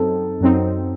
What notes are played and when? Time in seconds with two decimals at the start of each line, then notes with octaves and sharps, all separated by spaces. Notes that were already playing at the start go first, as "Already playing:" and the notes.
Already playing: F#2 F#3 C4 D#4 A4
0.41 F#2 F#3 C4 D#4